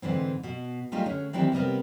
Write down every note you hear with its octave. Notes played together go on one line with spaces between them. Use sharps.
G#2 D3 E3 C4
B2
G3 A3 D#4 F4 G4 G#4
D3 C#4 G#4
D#3 E3 C4 D4 E4 G4
C3 G3 B3 A#4